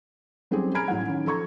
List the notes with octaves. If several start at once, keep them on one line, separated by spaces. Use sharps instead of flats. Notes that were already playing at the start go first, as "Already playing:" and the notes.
F#3 G3 C4 C#4 G4 G#4
G#5 A#5 B5 F6 G#6 D7
A1 F#3 F#5
D#3 C#4
F3 A4 A#5 C#6 G#6